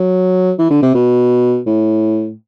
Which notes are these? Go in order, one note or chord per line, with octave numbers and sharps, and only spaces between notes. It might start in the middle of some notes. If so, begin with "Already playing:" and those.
Already playing: F#3
E3
D3
C3
B2
A2